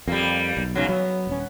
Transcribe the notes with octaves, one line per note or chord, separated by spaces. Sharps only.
F2 G3 A#3
B1
G#2 C#3 F#3
F#3 B3
D#1 C#4